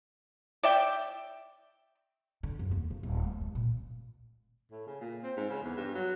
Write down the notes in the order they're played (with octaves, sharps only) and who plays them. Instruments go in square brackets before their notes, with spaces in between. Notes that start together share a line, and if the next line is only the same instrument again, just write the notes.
[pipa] D5 E5 G5
[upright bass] D3
F#2
D#2
F2
D#1
A3
G#3
A#2
[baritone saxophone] A2
C#3
A#2
C4
G#2
C#3
E2
G2
F#3